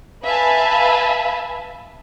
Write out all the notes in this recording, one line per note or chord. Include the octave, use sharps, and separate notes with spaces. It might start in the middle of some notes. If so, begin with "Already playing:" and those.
B4 E5 F5 G#5 A5 B5